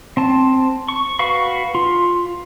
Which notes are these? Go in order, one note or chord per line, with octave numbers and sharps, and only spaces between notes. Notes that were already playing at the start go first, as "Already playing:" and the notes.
C4 A5
C#6
F#4 B4 F5 C#6
F4